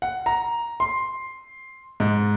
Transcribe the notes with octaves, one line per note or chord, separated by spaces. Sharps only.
F#5
A#5
C6
G#2